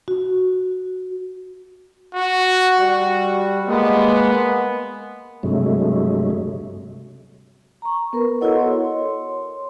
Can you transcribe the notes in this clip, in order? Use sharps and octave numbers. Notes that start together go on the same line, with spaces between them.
F#4
F#4
G3 F#4
G#3 A#3 B3
G2 C3 F#3 G#3 A3
A#5 C#6
B3 A#4 B4
E4 F#4 A4 C#5 D#5 F#5
C#5 C6